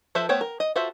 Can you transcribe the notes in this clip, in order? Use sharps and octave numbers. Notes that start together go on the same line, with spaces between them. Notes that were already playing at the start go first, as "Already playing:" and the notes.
F3 A4 B4 C5 E5
A3 B3 C5 C#5 G5
A#4
D#5
F4 F#4 A4 C5 E5